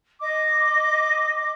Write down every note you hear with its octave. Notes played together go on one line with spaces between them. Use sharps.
D#5 D6